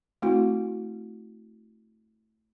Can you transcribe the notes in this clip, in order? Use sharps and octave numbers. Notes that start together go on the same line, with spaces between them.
A3 C4 E4 F#4